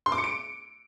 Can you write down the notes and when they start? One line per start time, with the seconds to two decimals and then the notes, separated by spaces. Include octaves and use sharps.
0.06 C6
0.12 D6
0.18 C#7
0.24 D7